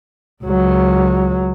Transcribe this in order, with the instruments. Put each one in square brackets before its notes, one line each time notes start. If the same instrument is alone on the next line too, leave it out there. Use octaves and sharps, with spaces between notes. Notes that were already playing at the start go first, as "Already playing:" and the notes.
[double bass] C#2 F#3